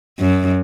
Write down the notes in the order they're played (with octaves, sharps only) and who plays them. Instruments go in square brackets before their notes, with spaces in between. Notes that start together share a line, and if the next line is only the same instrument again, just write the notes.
[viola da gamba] F#2